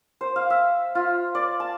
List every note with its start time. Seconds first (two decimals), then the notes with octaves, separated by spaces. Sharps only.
0.21 C5
0.36 F5
0.50 E5
0.95 F4
1.35 D5
1.60 A5